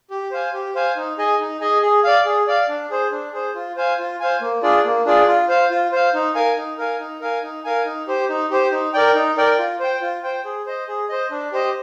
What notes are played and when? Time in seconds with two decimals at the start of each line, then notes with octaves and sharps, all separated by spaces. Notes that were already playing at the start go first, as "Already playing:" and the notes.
0.10 G4
0.31 C5 F5 G#5
0.53 G4
0.75 C5 F5 G#5
0.96 D#4
1.18 G#4 D#5 G#5
1.40 D#4
1.61 G#4 D#5 G#5
1.82 G#4
2.04 D5 F5
2.25 G#4
2.47 D5 F5
2.68 D4
2.90 G#4 C5
3.12 D4
3.33 G#4 C5
3.55 F4
3.77 C5 F5 G#5
3.98 F4
4.20 C5 F5 G#5
4.41 A#3
4.63 D4 F4 G#4 D5
4.84 A#3
5.05 D4 F4 G#4 D5
5.27 F4
5.49 C5 F5
5.70 F4
5.92 C5 F5
6.14 D#4
6.35 A#4 F5 G#5
6.57 D#4
6.78 A#4 F5 G#5
7.00 D#4
7.21 A#4 F5 G#5
7.43 D#4
7.64 A#4 F5 G#5
7.86 D#4
8.07 G4 C5
8.29 D#4
8.51 G4 C5
8.72 D#4
8.94 A#4 D5 G5
9.15 D#4
9.37 A#4 D5 G5
9.58 F4
9.80 C5 G5
10.01 F4
10.23 C5 G5
10.45 G#4
10.66 C5 D#5
10.88 G#4
11.09 C5 D#5
11.31 D4
11.52 G4 C5 D#5